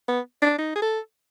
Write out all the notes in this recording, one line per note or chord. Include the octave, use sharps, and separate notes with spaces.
B3
D4
D#4
G#4
A4